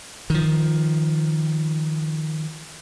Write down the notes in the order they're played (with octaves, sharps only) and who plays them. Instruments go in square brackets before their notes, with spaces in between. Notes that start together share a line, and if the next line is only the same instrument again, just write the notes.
[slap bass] D#3 F3